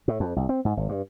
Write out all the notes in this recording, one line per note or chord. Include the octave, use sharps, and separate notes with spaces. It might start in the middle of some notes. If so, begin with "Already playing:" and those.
A2
F2
C2
C4
G#2
G#1
G2